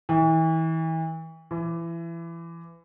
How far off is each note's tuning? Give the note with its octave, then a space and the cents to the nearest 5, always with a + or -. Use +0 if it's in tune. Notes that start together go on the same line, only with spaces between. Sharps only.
E3 -35
E3 +25